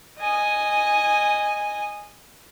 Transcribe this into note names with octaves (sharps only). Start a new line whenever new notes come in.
D#5 G#5